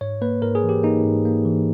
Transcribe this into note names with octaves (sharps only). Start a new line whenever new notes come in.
G#2 C#5
A#3 B4
G#2 A#4
G#4
E3
G4
A#3 D#4
G#2
A#3
E3